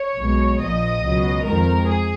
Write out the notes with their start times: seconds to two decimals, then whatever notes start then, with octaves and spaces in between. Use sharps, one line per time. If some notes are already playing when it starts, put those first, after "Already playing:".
Already playing: C#5
0.17 B1 B2 G#3
0.59 A#1 A#2 F3 D#5
1.02 C#2 B2 F#3
1.44 F2 D#3 G#3 A#4
1.86 G#4